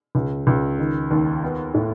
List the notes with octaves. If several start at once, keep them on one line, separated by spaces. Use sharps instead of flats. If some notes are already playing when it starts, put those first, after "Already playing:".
C#2
C#2
D#3
D#2
B3
A2